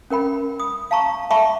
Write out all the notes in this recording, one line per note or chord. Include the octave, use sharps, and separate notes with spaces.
C#4 A#4 G5 B5
D#6
F5 A5 A#5 C#6
E5 F#5 A5 B5 C#6 D6